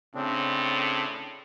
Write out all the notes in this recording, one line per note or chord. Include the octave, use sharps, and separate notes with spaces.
A2 C#3 C4 D4